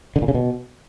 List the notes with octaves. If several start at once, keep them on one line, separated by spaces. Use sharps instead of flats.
D3
A#2
C#3
B2